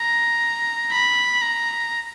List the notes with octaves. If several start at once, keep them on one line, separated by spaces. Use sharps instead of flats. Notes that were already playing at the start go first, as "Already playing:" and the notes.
Already playing: A#5
B5
A#5